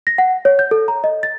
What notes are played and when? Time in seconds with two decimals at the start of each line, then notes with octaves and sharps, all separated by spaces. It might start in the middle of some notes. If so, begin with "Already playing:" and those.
0.07 A#6
0.18 F#5
0.45 C#5
0.59 G6
0.71 A4
0.88 A#5
1.04 D#5
1.23 A6